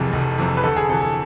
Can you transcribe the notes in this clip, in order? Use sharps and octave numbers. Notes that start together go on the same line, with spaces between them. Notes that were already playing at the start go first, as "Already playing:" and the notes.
Already playing: F1 F2 C3 E3 G#4
F1
F2 C3 E3
B4
D2 A4
G#4
C3 E3 A4
A4